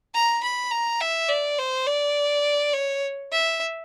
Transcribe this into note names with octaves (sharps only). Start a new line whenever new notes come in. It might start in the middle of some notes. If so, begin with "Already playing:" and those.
A#5
B5
A#5
E5
D5
C5
D5
C#5
E5